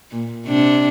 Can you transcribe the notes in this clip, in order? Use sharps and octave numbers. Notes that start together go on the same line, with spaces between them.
A#2
C3 D4